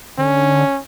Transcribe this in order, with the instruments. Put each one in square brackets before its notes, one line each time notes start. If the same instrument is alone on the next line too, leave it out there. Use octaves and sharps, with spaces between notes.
[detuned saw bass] D3 [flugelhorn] C#4